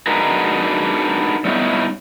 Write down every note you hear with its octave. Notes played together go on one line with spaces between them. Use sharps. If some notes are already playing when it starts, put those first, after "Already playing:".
D4 D#4 F#4 G#4 A#4 B4
G3 B3 C#4 D#4 E4